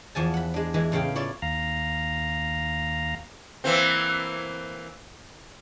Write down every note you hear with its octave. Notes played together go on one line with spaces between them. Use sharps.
E2 F3 G#5 A5
F#5 B5
G#3 D4
E3 G#3
A2 C#3 F5 G5
E4 F4 C#5 D5
D#2 F5 A#5
E3 A#3 C4